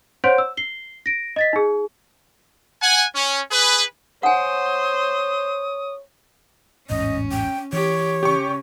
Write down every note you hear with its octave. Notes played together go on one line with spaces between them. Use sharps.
C5 C#5 F#5 C6 G6 D7
E6
C7 G7
A#6 D7
D#5 A6 B6
D#4 G#4
F#5 G#5
C#4
G#4 B4
C5 C#5 F#5 G#5 D#6
A1 E2 G#2 C#4 D#5
G5
E3 G4 C#5
C#3 G4 C#6